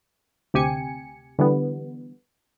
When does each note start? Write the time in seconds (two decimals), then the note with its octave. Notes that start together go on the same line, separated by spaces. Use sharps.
0.54 D2 C3 G4 G#5 C#7
1.39 D3 E3 G3 B3